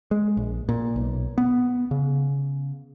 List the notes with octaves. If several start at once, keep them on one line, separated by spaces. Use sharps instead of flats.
G#3
A#1
A#2
B1
B3
C#3